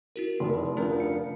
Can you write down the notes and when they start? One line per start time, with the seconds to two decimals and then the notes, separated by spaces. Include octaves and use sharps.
0.16 E4 F#4 A#4
0.40 F1 C6
0.77 D2 F3 C#4 A#4
1.00 C#7